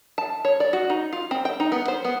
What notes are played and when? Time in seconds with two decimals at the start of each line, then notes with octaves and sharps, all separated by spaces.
0.18 A5
0.45 C#5
0.60 D5
0.73 F#4
0.90 D#4
1.13 F4
1.31 C4
1.45 G5
1.60 D#4
1.72 B3
1.88 C5
2.04 B3